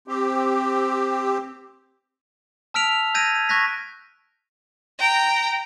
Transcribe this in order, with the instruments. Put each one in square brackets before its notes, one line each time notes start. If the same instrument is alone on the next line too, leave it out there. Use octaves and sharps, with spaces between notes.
[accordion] C4 G4
[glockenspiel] A5 E6 F6 B6 D7 F7
E6 G6 G#6 A#6 D7 D#7
C#6 F#6 G#6 A#6 B6
[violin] G5 A#5